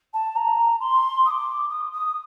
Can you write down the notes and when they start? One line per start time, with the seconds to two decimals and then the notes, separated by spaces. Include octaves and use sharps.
0.14 A5
0.36 A#5
0.81 C6
1.26 D#6
1.31 D6
1.70 D#6
1.92 D#6